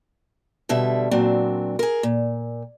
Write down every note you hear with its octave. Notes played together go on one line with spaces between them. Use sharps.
B2 D3 G3 E5
A#2 F#3 C4 D4
G#4 A#4
A#2